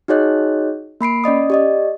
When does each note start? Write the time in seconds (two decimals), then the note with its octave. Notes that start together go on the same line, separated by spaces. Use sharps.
0.08 D#4 F#4 G#4 C#5 D#5 F#6
1.01 A#3 B5 C7 D7
1.24 C#4 D5 D#5 D#6
1.50 G4 D5 D#5